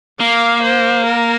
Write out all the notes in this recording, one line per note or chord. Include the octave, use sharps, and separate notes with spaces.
A#3 F5
C5
A#4